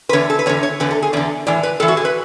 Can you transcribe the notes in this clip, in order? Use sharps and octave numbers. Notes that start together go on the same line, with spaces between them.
B4
E2 D3 C#5
A4
B4
E2 D3 C#5
C#5
E2 D3 B4
A4
G#4
E2 D3 D5
A2 E3 D5
B4
A2 E3 A4
F#4
G#4
B4